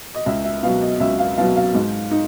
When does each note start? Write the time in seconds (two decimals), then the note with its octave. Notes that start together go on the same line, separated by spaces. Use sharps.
0.15 D#5
0.26 C#2 E5
0.44 E5
0.63 B2 F#3 F5
0.82 D#5
1.00 C#2 E5
1.19 F5
1.38 B2 F#3 F5
1.56 F5
1.75 G#2
2.11 D#4